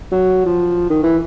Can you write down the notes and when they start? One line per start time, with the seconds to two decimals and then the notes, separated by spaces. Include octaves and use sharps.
0.12 F#3
0.46 F3
0.90 D#3
1.03 E3